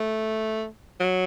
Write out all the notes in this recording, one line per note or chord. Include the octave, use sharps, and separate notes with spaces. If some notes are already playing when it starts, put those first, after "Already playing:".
Already playing: A3
F#3